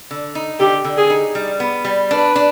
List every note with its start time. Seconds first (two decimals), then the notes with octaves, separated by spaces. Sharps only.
0.11 D3
0.35 D#4
0.60 D3 G4
0.84 D3
0.98 G#4
1.10 D#4
1.35 G3
1.60 B3
1.85 G3
2.10 D4 B4
2.36 D4